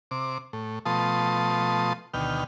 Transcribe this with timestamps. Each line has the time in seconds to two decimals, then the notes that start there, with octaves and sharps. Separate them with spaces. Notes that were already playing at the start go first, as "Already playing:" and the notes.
0.11 C3 D6
0.53 A2
0.86 B2 F3 A3 A5 C6 D#6
2.14 D2 B2 D#3 G5 F6